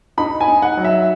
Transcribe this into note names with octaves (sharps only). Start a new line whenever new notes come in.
D#4 B5
G#5
D#4
F#5
F#3
E5